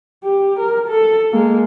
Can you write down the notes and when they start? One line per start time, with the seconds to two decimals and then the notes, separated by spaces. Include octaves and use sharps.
0.24 G4
0.59 A#4
0.88 A4
1.33 G#3 A#3